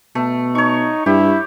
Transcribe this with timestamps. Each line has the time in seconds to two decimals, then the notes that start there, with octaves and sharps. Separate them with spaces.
0.15 B2 A3
0.55 D#4 C#5 C#6
1.06 G2 E4 G4